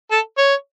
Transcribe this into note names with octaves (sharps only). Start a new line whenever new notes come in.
A4
C#5